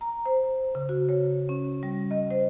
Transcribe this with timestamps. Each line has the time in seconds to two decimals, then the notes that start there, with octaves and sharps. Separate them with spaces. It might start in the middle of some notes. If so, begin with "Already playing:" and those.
0.01 A#5
0.26 C5
0.75 C#3
0.89 F#4
1.09 C#5
1.49 C#4
1.83 G3
2.11 D#5
2.31 C5